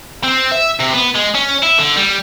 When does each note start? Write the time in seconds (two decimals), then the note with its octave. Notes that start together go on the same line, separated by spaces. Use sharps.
0.24 C4
0.51 E5
0.80 C3
0.93 B3
1.15 G#3
1.35 C#4
1.62 E4
1.78 D3
1.97 G3